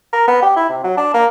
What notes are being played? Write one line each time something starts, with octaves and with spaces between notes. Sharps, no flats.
A#4
B3
G4
E4
C3
F#3
D4
A#3